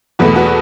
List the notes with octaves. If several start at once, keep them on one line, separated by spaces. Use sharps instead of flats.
E2 B2 A3 F#4 B4
F#4 B4